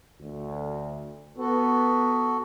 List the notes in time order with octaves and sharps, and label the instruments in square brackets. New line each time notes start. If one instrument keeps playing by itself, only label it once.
[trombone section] D2
[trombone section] B3 [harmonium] F#4 A4